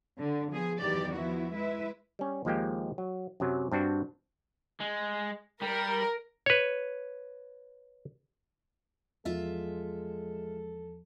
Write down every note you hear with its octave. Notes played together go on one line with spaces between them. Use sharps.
D3
F3 B3 G#4
E2 D#3 E3 F#3 G4 D5
F3 B3 E4 F#4
G#3 E4 B4 E5
G3 C#4
D#2 F3 G#3 A#3 G4 G5
F#3
F#2 C3 F#3
G2 C4 D4 F#4
G#3
G3 A#4
B4 C#5
E2 F3 G#3 F4 A4 E5